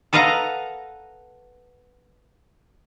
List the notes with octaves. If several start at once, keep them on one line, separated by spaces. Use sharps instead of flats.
A4 B4 D#5 F5 F#5 A#5